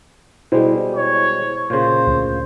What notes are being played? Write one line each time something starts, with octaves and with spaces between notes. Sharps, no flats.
B2 G3 G#3 E4 C5
C#5
A#2 C#3 C5
D2